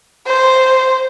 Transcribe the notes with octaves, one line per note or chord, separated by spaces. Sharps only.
C5